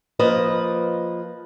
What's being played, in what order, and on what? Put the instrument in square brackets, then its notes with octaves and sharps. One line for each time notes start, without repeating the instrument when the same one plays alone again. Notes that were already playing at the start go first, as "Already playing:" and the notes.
[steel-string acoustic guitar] F3 A#3 B4 D#5